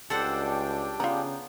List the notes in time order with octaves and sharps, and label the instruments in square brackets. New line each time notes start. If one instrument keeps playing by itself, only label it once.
[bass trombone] C#2 [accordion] G3 D4 G5 [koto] A4 C5 F#5
[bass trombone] C#3 [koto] B3 [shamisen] F4 A#5